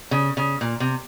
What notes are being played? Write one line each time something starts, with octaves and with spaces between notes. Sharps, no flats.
C#3
C#3
A#2
C3